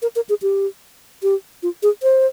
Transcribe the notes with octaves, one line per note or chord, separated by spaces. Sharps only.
A#4
A#4
G#4
G4
G4
F4
G#4
C5